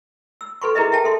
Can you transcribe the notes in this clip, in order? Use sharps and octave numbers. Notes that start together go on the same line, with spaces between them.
E6
A4 B4 C6 C#6
E4 G#4 A#4 B4 D#5 E5
E5 G5 A5
A4 E5 C6